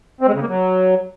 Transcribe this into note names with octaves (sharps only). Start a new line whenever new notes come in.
C4
G#3
C#3
A#3
F#3